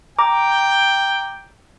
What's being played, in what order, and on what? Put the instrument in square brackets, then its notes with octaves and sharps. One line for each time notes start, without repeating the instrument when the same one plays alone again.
[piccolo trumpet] G5 [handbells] A#5 D6